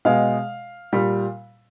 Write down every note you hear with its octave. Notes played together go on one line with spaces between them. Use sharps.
B2 G#3 F5
A#2 G3